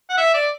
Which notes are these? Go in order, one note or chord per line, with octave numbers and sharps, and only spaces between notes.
F#5
E5
D5